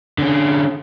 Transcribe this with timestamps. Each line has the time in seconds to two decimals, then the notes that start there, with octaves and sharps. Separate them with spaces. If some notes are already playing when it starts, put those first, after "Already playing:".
0.18 D3 C#4